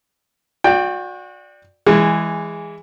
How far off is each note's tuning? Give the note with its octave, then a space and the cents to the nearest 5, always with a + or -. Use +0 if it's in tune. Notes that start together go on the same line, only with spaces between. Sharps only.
F#4 -30 D5 +0 G5 +10
E3 +5 G#3 -15